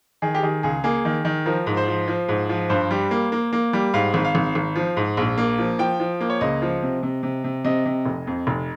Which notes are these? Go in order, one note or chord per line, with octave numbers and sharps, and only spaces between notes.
D#3 G#4
G4
D#3 G#4
C#2 G#4
A#3 G#4
D#3
D#3
F3 A#4
G#2
C5
F3
F3
G#2
F3
G2 C5
G3
A#3
A#3
A#3
G3
G#2 F5
G#1
F5
G#1
G#1
F3
G#2
A#1
A#3
F3
F3 G5
F3
A#3
C#5
C#2 D#5
F3
C3
C3
C3
C3
C3 D#5
C3
F1
F2
F1